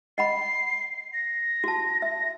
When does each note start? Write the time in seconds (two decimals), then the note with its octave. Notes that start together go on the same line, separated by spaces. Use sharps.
0.18 D#5 F#5 B5 C7
1.13 A#6
1.64 F#4 A5
2.02 E5 A#6